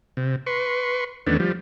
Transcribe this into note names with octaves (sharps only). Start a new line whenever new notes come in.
C3
B4 C6 C#6
E2 D#3 A3 B3 C#4 D4
F3 G3